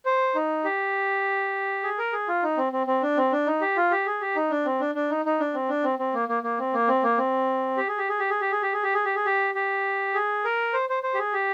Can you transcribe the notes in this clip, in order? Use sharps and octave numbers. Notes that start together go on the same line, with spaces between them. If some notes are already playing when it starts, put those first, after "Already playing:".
C5
D#4
G4
G#4
A#4
G#4
F4
D#4
C4
C4
C4
D4
C4
D4
D#4
G4
F4
G4
G#4
G4
D#4
D4
C4
D4
D4
D#4
D#4
D4
C4
D4
C4
C4
A#3
A#3
A#3
C4
A#3
C4
A#3
C4
G4
G#4
G4
G#4
G4
G#4
G4
G#4
G4
G#4
G4
G#4
G4
G#4
G4
G4
G#4
A#4
C5
C5
C5
G4
G#4
G4